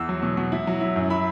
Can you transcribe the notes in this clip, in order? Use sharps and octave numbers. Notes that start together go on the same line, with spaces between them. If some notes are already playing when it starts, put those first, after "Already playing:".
Already playing: E2 E6
F#3
B2
B2
E4
F#3
E4
F#2
E4 B5